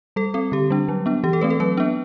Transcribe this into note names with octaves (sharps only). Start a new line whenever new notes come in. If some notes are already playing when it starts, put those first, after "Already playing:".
G3 A4
C4 A4
D3 G4
G3 D4
F#3
B3 D4
E3 G4
A4
A3 C4 B4
A4
F#3 B4
B3 D4